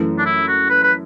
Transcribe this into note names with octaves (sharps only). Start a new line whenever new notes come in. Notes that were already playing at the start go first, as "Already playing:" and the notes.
Already playing: F#2 E3 A3
D4
E4
F#4
B4
B4